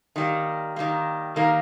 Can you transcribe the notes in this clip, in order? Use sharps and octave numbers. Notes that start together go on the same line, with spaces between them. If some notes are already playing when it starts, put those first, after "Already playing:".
D#3 G3 A#3
D#3 G3 A#3
D#3 G3 A#3